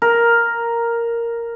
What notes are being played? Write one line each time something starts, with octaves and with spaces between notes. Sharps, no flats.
A#4